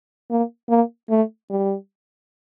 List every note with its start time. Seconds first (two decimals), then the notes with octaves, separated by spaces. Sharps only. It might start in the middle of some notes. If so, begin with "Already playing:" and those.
0.30 A#3
0.69 A#3
1.10 A3
1.50 G3